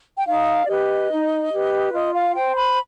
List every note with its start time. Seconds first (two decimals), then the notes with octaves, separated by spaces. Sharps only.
0.15 G5
0.26 D#4 F5
0.63 D5
0.68 G4 B4 D#5
1.10 D#4
1.51 G4 B4
1.93 F4 D#5
2.14 F5
2.35 C5 G5
2.56 B5